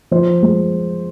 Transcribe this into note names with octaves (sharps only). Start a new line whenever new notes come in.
F3 C5
G#3